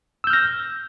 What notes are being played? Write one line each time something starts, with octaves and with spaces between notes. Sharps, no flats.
E6 F6 G6 A#6